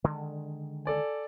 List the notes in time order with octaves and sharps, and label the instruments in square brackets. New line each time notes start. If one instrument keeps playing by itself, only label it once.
[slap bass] D3 D#3 G#3
[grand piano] A4 D5 G#5